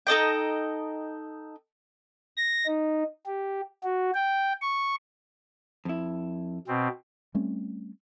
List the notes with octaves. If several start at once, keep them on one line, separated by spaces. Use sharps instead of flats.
D#4 A4 D#5 G5
A#6
D#4
G4
F#4
G5
C#6
F2 E4
B2 C4
G3 A3 C4 C#4